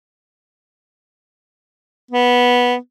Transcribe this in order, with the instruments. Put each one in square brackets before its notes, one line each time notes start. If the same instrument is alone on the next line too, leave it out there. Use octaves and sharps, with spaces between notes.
[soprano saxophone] B3